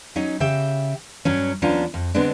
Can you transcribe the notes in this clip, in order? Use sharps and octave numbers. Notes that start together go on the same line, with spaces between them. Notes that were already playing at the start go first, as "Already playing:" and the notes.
F#3 C#4 D#4
C#3 G4 E5 G5
G2 F#3 C#4
D#2 F3 B3 C#4 D4 A#5
F2
D3 G#3 B3 C4 D4